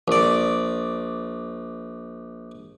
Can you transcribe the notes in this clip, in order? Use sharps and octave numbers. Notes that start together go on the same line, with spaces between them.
A#1 D5